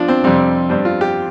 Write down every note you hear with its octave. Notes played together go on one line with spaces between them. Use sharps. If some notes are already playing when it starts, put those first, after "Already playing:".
Already playing: F3 D4 F4
C4
F2 C3 G3 C4
G2 G3 C4
F4
G4